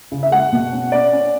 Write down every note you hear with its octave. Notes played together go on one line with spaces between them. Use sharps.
C#3
E5
G#3 F#5
B2
C#4
C#4 D5
C#4